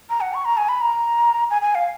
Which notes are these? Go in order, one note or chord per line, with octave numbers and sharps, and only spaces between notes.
A#5
F#5
C#6
A#5
G#5
B5
A#5
G#5
G#5
F5